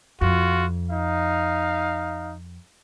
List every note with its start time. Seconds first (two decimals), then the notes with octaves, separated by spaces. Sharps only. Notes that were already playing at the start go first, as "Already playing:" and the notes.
0.21 F2 F4 F#4
0.90 D#4 F5